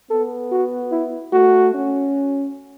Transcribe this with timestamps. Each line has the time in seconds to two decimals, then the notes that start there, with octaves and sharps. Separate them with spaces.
0.10 B3 A4
0.52 F#4
0.92 E4
1.33 A3 F#4
1.74 C#4